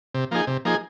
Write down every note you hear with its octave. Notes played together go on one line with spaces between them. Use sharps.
C3
F3 A#3 D#4 G#4
C3
F3 A#3 D#4 G#4